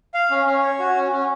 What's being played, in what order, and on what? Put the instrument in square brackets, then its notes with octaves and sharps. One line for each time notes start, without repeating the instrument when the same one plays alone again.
[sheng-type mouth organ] F5
C#4
C#4
C#5
F#4
C#4
C#4